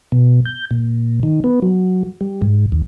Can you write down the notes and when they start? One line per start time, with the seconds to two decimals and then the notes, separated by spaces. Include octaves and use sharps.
0.12 B2
0.45 G6
0.71 A#2
1.23 D#3
1.44 B3
1.62 F#3
2.21 G3
2.42 G#2
2.72 D#2